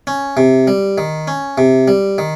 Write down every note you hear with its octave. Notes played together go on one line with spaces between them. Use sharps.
C#4
C3
G3
D#3
C#4
C3
G3
D#3